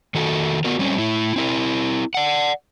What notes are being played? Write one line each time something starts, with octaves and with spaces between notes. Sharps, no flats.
D#3 F#4 A4
B3 F#4 A#4
G3 C4 C#4
A2 E4
C4 E4 A#4
D5 F#5